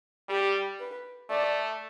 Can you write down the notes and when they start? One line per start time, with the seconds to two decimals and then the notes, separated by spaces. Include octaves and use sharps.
0.29 G3 G4
0.80 B4
1.29 A3 D5